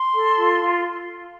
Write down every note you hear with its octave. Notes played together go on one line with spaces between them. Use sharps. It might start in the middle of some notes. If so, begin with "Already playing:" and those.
Already playing: C6
A4
F4
F4